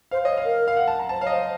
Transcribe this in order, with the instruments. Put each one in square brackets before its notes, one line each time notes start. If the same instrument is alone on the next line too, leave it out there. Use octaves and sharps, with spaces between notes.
[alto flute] C5 [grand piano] F5
[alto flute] C#5 [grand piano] D#5
[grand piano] F5
[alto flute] A#4
[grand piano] F5
F#5
A5
A#5
[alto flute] C5 [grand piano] A5
[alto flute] C#5 [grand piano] F5
[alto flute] C5 [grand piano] D#5